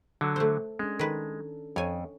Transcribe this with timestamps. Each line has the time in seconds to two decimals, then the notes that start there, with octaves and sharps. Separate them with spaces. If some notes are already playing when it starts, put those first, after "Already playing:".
0.21 D3 F#3 A4
0.36 A3 C5
0.79 G#3 C#4 D4
0.99 D#3 A4 B4
1.76 F2 C#5 G#5